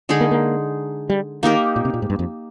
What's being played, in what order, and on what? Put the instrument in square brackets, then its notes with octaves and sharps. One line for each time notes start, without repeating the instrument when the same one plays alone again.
[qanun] D3 G#3 D#4 G#4
[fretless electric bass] A#3
A#3
G3
[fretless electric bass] D#3 [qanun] A#3 D#4 G4 A#4
[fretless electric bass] A#2
C3
A#2
G#2
G2
F2